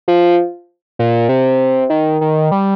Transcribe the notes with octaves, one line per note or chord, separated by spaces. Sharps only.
F3
A#2
C3
D#3
D#3
G3